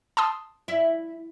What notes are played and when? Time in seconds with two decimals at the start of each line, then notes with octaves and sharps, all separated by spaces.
0.17 A5 C6 D#6
0.68 E4